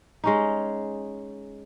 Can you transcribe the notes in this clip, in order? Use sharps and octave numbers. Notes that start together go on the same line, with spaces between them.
G#3 C#4 D#4